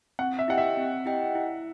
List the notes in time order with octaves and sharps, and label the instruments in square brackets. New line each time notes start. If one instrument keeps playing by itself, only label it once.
[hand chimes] C4 [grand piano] F#5
[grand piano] E5
[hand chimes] E4 G4 D#5 G5 [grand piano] F#5
[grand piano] E5
[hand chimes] C4
E4 G4 D#5 G5
E4